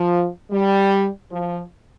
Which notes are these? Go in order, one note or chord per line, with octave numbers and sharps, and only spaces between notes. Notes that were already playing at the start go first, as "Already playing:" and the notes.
Already playing: F3
G3
F3